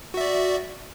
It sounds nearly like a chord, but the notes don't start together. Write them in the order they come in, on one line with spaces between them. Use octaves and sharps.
F#4 E5 D5